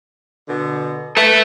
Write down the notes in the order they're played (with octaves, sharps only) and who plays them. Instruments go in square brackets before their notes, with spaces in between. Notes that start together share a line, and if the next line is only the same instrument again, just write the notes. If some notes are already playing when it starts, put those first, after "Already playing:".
[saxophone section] B2 D3
[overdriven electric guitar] A4 E5 [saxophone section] B4